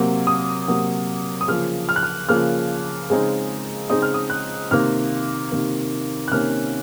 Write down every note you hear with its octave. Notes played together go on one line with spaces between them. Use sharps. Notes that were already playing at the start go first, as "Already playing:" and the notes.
Already playing: C3 F#3 A#3
D#6
C3 F#3 A#3
D#6
C#3 F3 A#3 F6
F6
F#6
F6
C#3 F3 A#3 F6
C#3 G#3 C4 D#4
C#3 G#3 C4 D#4 D#6
F6
D#6
F#6
C3 D#3 A#3 F6
C3 D#3 A#3
F#6
C3 D#3 A#3 C#4 F6